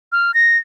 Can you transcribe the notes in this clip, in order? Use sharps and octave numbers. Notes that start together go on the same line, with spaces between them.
F6
A#6